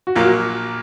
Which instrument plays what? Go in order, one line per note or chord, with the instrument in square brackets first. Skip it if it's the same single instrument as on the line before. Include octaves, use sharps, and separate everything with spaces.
[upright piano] F#4
[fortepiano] A#1 A#2 F#3 A#3 [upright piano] F4
[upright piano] F#4